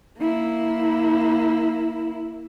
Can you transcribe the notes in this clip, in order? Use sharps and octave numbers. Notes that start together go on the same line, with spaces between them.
A#3 E4